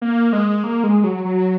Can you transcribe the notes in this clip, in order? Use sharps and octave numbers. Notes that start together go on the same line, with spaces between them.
A#3
G#3
A#3
G#3
F#3
F#3